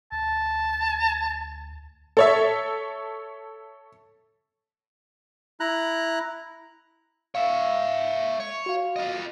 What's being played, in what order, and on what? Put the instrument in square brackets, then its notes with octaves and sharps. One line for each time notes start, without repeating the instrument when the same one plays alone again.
[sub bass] D2 [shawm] A5
[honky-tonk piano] A4 C#5 E5
[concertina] E4 A#5 F#6
[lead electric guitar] C#5 E5 [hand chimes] F5
[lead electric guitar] C#5
[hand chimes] F#4 F5
[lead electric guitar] F4 D#5